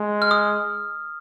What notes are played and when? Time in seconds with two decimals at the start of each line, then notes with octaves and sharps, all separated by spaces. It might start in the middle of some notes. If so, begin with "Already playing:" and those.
Already playing: G#3
0.22 F6
0.31 D#6